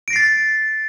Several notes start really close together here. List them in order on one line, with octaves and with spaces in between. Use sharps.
D7 A#6 C7 A6